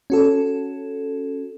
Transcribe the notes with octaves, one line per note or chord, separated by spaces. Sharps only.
C#4 F#4 A4